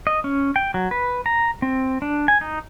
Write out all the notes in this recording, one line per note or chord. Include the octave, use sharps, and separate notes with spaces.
D#5
C#4
G5
F#3
B4
A#5
C4
D4
G#5
D#4